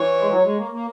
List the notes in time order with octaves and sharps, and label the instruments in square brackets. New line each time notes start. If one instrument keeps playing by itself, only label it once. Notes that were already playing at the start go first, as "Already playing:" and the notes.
Already playing: [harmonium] E3 [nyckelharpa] C#5
[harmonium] G#3
F#3
G#3
A#3
A#3